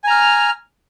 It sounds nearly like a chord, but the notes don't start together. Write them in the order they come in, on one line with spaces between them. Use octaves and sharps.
G#5 A#5 F6